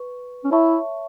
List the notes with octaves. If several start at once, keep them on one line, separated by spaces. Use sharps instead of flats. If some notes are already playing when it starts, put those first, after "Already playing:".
Already playing: B4 C#6
C#4
E4 C#5 E5 A5 C#6